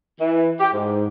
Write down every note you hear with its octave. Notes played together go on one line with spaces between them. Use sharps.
E3
G4
G#2